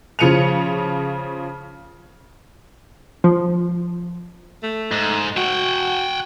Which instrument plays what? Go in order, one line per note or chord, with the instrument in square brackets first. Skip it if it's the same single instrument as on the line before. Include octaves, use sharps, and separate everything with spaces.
[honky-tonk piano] C#3 F3 C#7 D#7 F7
[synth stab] F3
[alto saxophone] A3
[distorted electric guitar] G#2
[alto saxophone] F#4 [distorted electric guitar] F#5 G5